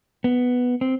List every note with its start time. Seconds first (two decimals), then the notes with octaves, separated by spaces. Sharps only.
0.24 B3
0.81 C4